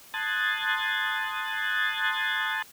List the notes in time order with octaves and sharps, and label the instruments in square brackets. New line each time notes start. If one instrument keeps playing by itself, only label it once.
[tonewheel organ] A5 C6 D#6 F#6 G#6 A6